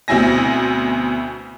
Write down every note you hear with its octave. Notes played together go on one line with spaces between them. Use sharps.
D2 B2 C4 E4 G#5 A#6